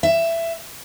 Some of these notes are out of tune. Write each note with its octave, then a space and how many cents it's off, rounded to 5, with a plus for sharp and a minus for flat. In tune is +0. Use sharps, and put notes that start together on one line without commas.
E5 +15